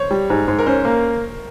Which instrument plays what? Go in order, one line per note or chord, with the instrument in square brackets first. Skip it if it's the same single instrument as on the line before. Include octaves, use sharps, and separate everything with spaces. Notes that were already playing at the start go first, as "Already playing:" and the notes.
Already playing: [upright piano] C5 C#5
[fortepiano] G3
G#2
G#2
[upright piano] A#4
[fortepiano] C#4 [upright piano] C5
[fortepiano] A#3